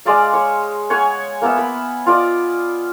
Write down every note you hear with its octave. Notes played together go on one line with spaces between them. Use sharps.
G#3 D5 D#5 F5
C#5
C#5 F#5 G#5
A#3 B3 E5
B5
F4 D5 D#5